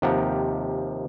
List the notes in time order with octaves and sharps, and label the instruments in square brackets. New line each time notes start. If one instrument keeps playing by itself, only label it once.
[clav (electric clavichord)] D#2 C3 F3 G4 F#5 A#5